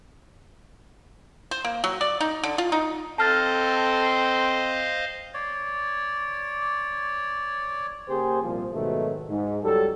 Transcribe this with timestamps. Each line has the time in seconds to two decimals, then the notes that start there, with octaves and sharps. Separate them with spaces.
1.51 C5
1.65 A#3
1.84 F#3
2.01 D5
2.21 D#4
2.44 D3
2.58 F4
2.72 D#4
3.18 C4 A4 C5 D#5 F5 A5 F6 A6
5.34 C#5 D5
8.09 C#3 A#3 G4 G#4 C5
8.43 C2 A#2 F3
8.74 G#2 B2 D#3 F#3 A3
9.29 G#2
9.63 C#2 F#3 G3 A4